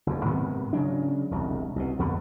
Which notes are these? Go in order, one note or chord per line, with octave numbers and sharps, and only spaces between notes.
F#1 E2
G#2 C3 D#3 B3
C#3 F#3 D4
E1 C2
C2 B2
A#1 F2 D3 B3